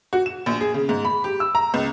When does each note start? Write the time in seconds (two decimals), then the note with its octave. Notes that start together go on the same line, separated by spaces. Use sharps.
0.13 F#4
0.26 E7
0.46 A#1
0.61 G#4
0.74 C#3
0.89 G#2
1.05 B5
1.24 G4
1.40 E6
1.55 A#5
1.74 C#2